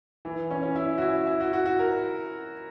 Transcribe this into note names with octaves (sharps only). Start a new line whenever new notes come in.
E3
C#4
C#4
E4
F#4
E4
E4
F#4
F#4
F#4
A#4